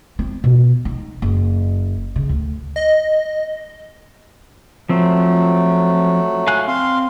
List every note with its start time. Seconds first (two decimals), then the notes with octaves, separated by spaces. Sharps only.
0.19 C4
0.44 B2
0.85 D#4
1.22 F#1
2.16 C#3
2.29 D2
2.76 D#5
4.89 F3 F#3 A3 C4
6.47 F5 G#5 F#6
6.68 C4 F5 C6